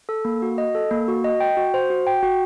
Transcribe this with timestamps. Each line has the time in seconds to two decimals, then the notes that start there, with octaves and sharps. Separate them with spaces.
0.09 A4
0.25 A#3
0.42 F#4
0.58 D#5
0.75 A4
0.91 A#3
1.08 F#4
1.24 D#5
1.40 G5
1.57 F#4
1.74 C5
1.90 F#4
2.07 G5
2.23 F#4